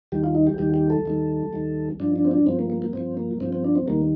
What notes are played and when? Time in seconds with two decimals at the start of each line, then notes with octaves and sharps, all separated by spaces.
0.12 D#2 D#3 G3 G4
0.24 F4
0.35 D#4
0.47 G4
0.58 D#2 D#3 G3 G4
0.74 G4
0.90 A4
1.05 D#2 D#3 G3
1.53 D#2 D#3 G3
2.00 G2 F3 D4
2.16 D4
2.25 C4
2.31 D4
2.46 G2 F3 C4
2.59 A#3
2.70 A#3
2.82 A#3
2.93 G2 F3 C4
3.17 A#3
3.40 G2 F3 C4
3.53 C4
3.64 D4
3.75 C4
3.88 D#2 D#3 G3 A#3